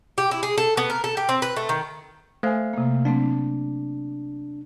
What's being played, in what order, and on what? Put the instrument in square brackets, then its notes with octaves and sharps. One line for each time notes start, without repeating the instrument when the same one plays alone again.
[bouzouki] G4
E4
G#4
A4
B3
A#4
A4
G4
C4
B4
A3
D#3
[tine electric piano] A3 F5 [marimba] C5 G#5
[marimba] C3 A#3
[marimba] F#3 A3 C4 [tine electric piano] D4